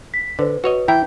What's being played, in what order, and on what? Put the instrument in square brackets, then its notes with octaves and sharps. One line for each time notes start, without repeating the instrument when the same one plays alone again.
[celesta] B6
[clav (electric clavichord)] D3 [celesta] B4 C5
[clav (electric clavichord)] F#4 C#5 D#5 [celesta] B4
[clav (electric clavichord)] E3 E4 A#5 [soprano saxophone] G5